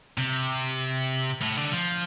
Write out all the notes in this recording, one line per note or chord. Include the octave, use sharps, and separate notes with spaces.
C3
A2
D3
F3